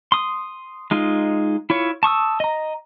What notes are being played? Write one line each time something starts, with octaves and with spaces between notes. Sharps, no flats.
C6 D#6
G#3 D#4 F4
E4 F4 C#5
A5 C#6 D#6 E6
D#5 A#5